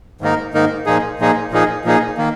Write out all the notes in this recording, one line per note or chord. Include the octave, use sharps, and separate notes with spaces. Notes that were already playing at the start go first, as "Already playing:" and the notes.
G#2 D#3 A#3 D#4 A#4
G#2 D#3 A#3 D#4 A#4
A#2 F3 A#3 D#4 G#4
A#2 F3 A#3 D#4 G#4
A#2 F3 A#3 D#4 G#4
A#2 F3 A#3 D#4 G#4
D#3 A#3